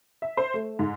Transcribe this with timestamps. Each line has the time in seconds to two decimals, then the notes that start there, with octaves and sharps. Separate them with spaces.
0.22 E5
0.37 C5
0.54 A3
0.79 G#2